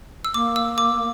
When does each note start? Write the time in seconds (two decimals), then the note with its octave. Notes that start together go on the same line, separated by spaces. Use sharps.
0.25 E6
0.34 A#3 D6
0.56 E6
0.78 D6